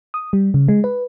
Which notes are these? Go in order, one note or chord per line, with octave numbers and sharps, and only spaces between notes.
D#6
G3
C#3
G#3
B4